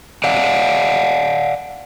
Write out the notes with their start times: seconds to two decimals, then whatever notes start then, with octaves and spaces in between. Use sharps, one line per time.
0.24 D5 F5 F#5